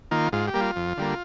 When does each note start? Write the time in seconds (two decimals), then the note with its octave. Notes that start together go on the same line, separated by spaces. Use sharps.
0.11 D#3 A#3 F4
0.32 G#2 F4
0.47 G4
0.54 G3 A#3
0.61 F4
0.76 F2
0.97 D3 G3 A#3